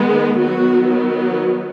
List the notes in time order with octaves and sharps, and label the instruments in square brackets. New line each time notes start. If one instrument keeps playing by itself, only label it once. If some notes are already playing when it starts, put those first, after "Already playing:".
Already playing: [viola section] D#3 G#3 B3
D#3 F#3 B3 F#4